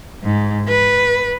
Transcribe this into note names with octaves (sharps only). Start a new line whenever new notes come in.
G#2
B4